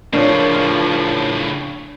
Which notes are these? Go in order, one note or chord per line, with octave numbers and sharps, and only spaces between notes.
A2 C#3 F3 D4 A#4 C#5 D5